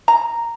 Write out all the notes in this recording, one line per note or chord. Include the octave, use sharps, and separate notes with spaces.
A#5